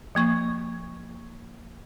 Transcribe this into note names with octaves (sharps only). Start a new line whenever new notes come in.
F3 A#3 C#6